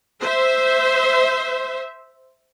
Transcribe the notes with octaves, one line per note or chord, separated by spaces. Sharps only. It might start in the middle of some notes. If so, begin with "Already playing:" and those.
C5 E5